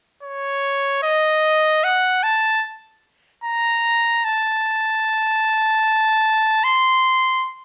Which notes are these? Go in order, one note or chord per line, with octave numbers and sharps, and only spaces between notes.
C#5
D#5
F#5
A5
A#5
A5
C6